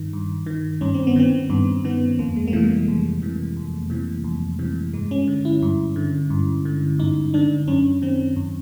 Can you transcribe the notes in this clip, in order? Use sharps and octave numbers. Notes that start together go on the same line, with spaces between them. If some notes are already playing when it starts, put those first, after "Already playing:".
Already playing: G2 D#3
G2
D#3
G2 C#4
C4
B3
D#3 C4
G2 B3
D#3 B3
F2 A#3
G#3
A#3
C3 E3 A3
G3
G#3
F2
C3 E3
F2
C3 E3
F2
C3 E3
G2 G#3
C#4
D3
E4
G2
D3
G2
D3
G2 D#4
D3 D4
F#2 C#4
D#3 C4
F#2